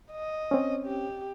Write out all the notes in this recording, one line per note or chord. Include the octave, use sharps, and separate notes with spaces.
D#5
C4 C#4
G4